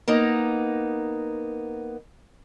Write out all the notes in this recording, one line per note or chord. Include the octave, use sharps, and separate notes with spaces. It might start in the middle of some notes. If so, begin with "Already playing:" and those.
A#3 B3 D#4